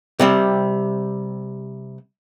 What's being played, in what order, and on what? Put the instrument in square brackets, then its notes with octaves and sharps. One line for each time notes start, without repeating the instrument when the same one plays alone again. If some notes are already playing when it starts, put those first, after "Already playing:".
[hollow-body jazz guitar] C3 G3 C4